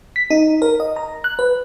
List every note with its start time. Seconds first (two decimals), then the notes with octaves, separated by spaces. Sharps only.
0.16 B6
0.30 D#4
0.62 A#4
0.80 D#5
0.96 A#5
1.24 F#6
1.39 B4